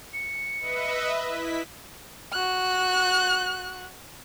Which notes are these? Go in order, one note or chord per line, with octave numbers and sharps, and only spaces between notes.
C#7
B4 D#5 E5
E4 B6
F#4 F#6